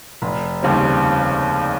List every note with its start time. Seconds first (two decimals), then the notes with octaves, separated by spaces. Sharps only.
0.22 F1
0.63 D#2 C#3 G3 C4